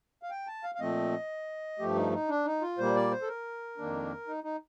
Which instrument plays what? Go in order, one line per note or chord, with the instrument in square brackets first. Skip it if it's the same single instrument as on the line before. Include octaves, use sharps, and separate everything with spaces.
[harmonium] F5
G5
A5
F5
F5
A#2 F3 A3 C4 D#5
G2 F3 A3 G4
D#4
D#4
D4
D#4
F4
A#2 G3 A#3 C5
D5
C5
A4
A#4
F2 D#3 A#3 D4
D#4
D#4